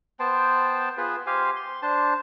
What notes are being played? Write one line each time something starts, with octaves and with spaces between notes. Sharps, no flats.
B3 C5 G5 A5
B3 F4 G#4 B4
G4 C5 F5 G#5
C6
D4 C5 A5